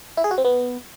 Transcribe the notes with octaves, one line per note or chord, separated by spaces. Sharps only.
E4
G#4
F#4
C4
B3